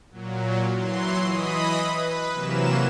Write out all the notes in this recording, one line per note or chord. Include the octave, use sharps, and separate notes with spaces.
A#2 F#3
E3 F#3 C6
E3 D#5 B5 D#6
B4
C3 E3 F#3 A#3 E7